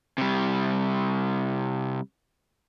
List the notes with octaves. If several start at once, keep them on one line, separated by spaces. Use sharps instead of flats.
C3 G3